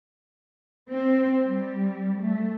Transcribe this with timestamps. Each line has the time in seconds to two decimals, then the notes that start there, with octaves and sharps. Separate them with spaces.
0.89 C4
1.45 G3
2.20 A3